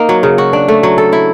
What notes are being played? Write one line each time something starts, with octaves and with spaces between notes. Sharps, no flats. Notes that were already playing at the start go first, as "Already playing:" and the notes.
Already playing: A#3 D#4
F#3
C#3
F#4
D4
A3
F#3
A4
E4